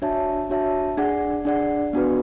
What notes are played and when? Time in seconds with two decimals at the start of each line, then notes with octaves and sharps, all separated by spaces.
0.02 D4 F#4 C#5 E5 A5
0.50 D4 F#4 C#5 E5 A5
0.98 D4 G#4 D5 F#5
1.45 D4 G#4 D5 F#5
1.93 B3 D4 F#4 B4